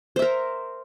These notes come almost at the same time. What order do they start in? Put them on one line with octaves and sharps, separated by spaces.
C5 E5 A#4